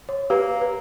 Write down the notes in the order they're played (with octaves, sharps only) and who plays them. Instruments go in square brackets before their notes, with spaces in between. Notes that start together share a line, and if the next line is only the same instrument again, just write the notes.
[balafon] C#5
[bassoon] A#3 [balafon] G4 B4
[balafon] B4